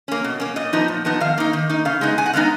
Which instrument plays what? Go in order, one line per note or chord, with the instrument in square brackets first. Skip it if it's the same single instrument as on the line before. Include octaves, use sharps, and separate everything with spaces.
[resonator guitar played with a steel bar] A#3 C#4
B2
A#3 C#4
A#2 D#5
F3 B3 D#4
A#2
F3 B3 D#4
D#3 F5
A#3 D#4
D#3
A#3 D#4
C#3 F5
G#3 B3 D#4
C#3 G#5
F#5
G#3 B3 D#4 F5